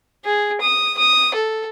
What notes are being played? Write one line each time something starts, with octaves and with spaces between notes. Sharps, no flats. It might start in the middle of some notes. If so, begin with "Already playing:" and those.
G#4
D#6
D#6
A4